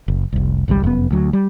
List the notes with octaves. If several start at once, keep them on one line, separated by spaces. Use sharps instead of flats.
F#1
F1 C2
G#1 C#2 D#3 G3
F1 F#2 C3 B3
D2 F#3
G3